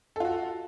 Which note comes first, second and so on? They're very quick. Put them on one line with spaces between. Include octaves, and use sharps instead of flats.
A4 F4 F#4